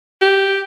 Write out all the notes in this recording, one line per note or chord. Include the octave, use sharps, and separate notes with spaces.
G4